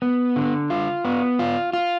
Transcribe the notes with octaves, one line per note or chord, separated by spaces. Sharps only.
B3
D3
F4
B3
F4
F4